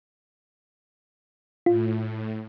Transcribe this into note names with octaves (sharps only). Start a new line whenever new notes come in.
A2 F4